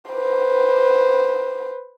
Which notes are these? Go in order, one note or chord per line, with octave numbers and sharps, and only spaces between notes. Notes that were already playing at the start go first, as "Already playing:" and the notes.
B4 C5